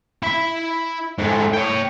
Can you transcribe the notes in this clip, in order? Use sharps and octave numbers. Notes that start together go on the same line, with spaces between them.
E4 B5
G#2 A3
C#5 G5